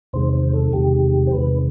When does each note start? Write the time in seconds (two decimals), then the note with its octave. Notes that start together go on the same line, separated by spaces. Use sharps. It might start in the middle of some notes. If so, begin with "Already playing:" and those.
0.13 E2 C3 D#3 G#3 C5
0.33 C5
0.53 A4
0.73 E2 C3 D#3 G#3 G4
1.27 C5
1.33 E2 C3 D#3 G#3 B4